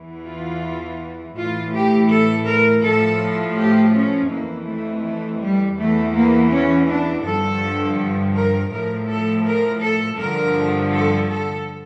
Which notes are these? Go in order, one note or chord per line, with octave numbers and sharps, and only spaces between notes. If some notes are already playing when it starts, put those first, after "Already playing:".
Already playing: E2 E3
F4
A2 E3 F4
G4
A4
A#4
A2 F3 A4
G4
C#4
F2 E3 A#3
A3
A3
G3
E2 E3 A3
A#3
C#4
D4
G2 D3 F3 A4
A#4
A2 F3 A#4
A4
A#4
A4
G2 D3 F3 A#4
A4
A4